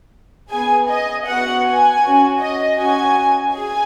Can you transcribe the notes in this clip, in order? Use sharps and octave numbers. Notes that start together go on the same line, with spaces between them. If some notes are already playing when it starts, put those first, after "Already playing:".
B3 G#4 G#5
D#5
B3 F#4 F#5
G#5
C#4 F#4
D#5
C#4 F#4 G#5
G#4 G#5